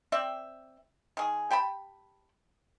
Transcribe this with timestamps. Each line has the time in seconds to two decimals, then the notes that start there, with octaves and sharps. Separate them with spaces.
0.12 C4 D5 E5 G5
1.17 D#3 G#4
1.51 G4 G5 A5 B5